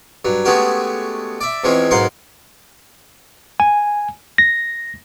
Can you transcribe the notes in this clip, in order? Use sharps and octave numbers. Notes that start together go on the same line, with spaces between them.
G2 F#3
G#3 A3 B3 C#4 F#4 G4
D5 E5
E2 E3 F3 G#3 C4 C#4
B1 G#2 A#4 F5 F#5 C6
G#5
A#6